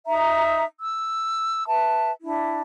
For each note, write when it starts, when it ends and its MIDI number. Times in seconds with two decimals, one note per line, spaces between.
0.07 0.65 63
0.07 0.65 76
0.07 0.65 82
0.79 1.67 88
1.67 2.12 71
1.67 2.12 76
1.67 2.12 81
2.23 2.61 62
2.23 2.61 64